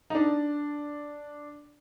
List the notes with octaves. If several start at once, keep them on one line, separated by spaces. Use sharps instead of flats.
D#4
D4